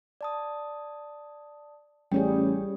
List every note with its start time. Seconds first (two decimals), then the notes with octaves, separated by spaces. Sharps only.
0.21 D5 A5 D#6
2.12 A1 G3 C#4 G#4 C#5 G5